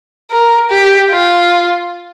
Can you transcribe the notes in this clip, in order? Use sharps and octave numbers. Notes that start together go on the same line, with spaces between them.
A#4
G4
F4